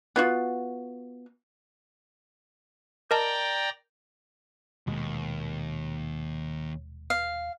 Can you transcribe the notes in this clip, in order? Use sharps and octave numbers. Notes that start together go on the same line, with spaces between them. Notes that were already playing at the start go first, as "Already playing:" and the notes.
B3 F4 F#4
A#4 D5 D#5 G5 A5 A#5
D#1 D#2 B2 G#3
F5